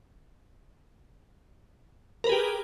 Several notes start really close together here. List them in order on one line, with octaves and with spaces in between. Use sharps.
A#4 B4 G#4 G4